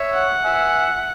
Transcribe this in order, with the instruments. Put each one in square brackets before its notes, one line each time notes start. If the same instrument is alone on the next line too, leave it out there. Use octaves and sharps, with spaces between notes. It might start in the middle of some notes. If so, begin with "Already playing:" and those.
Already playing: [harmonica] C#5 E5
[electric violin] F#5
[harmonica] E5 G#5